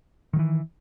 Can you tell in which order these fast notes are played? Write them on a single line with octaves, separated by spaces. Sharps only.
D#3 F#3 E3